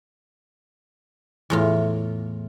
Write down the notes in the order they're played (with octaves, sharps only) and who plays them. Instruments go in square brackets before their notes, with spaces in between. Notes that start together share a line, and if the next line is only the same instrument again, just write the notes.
[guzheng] E2 A2 F4